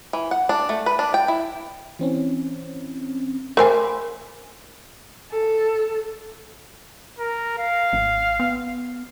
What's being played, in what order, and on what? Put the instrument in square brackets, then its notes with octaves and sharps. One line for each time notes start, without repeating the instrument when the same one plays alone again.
[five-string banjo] E3
F#5
D4
A3
B4
D4
G5
E4
[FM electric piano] E3 C4 C#4
[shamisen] A3 C5 G#5 [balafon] A#4 [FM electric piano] B5 D6
[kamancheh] A4
[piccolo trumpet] A#4
F5
[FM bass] G#1
B3